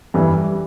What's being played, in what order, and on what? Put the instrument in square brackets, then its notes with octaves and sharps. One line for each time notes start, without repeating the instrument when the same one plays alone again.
[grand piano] G2 E3